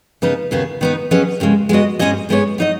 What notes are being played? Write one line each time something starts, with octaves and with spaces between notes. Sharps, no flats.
C#3 B3 D#4 B4
D#2 C#3 B3 G#4 B4
D#3 B3 D#4
F#3 C#4 G#4 B4 D#5
D#2 C#3 G#3
G#3 B3 F#4 D#5
G#2 G#3 C#4 G#4 D#5
G#2 G#3 B3 G#4 C#5
F#3 D#4 B4 D#5